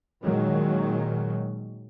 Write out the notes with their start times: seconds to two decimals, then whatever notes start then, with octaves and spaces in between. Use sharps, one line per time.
0.23 A#2 D#3 F#3 G#3